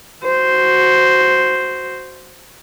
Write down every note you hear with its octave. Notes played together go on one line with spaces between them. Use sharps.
F#4 C5